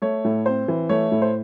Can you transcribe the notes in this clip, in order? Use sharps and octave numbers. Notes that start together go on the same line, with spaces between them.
A3 C#5
A2
C4 C5
E3
A3 C#5
A2
C5